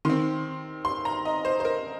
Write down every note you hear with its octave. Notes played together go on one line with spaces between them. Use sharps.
D#3 C4 C6
C6
A#5
D#5
C5
C5
A#4